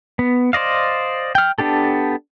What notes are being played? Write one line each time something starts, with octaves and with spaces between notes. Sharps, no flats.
B3
C5 D5 D#5 F5
G5 F6
B3 D4 G4 A4